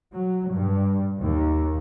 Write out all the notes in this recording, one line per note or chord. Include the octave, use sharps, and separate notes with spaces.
F#3
G2
D#2